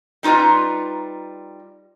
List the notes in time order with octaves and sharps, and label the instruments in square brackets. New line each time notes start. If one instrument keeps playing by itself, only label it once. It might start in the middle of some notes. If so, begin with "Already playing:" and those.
[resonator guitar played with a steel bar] G3 D#4 F4 B4 A#5